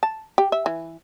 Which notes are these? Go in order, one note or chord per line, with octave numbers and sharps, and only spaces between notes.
A5
G4
E5
E3